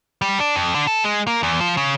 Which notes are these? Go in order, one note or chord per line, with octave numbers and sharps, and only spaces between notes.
G3
D4
F2
D3
A4
G#3
A#3
E2
F3
C#3